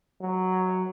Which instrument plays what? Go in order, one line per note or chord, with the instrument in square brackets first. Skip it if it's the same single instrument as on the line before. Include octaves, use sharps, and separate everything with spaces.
[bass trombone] F#3